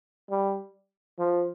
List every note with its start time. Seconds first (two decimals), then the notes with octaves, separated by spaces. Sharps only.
0.30 G3
1.18 F3